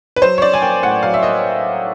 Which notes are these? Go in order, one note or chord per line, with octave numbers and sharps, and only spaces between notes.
B4
F#3 C5
C#5
C#4 D5
G#5
A#3 G5
A2 F#5
F#3 F5
E5
A#3 D#5